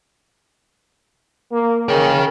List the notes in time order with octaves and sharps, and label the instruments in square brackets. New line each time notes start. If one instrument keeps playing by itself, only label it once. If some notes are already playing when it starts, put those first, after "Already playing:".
[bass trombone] A#3
[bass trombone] C#3 [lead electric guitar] A#4 G5